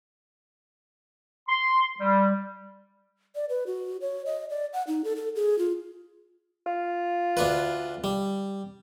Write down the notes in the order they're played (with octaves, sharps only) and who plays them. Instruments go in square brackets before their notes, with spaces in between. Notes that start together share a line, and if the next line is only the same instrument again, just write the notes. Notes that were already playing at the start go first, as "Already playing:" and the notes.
[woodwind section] C6
G3
[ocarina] D5
B4
F#4
C#5
D#5
D5
F#5
D#4
A4
A4
G#4
F4
[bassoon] F4
[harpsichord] D2 D4 B4
G3